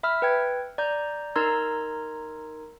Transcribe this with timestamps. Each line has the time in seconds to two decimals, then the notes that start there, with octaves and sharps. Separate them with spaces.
0.03 E5 B5 E6 F6
0.22 B4 G5 G#6
0.78 D5 A#5 G6
1.36 D#4 A#4 A#5 C6 E6 G#6